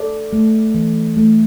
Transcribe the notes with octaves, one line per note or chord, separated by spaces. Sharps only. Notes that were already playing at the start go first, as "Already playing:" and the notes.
Already playing: A4 D5
A3
E3
A3